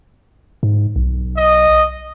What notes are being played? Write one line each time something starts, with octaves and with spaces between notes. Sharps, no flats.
G#2
B1
D#5